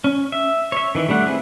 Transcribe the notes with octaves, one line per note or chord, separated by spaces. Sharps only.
C#4
E5
C#5 E5
D#3 E3
G3 A3 D4 F#5
C4 E4 G#4 B4